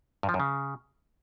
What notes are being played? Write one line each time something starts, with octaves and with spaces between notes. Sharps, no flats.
G2
F3
F#2
C#3